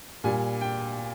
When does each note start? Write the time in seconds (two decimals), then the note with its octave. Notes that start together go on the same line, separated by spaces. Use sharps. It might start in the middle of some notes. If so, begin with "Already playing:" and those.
0.24 A#2 G3 G#5
0.61 G5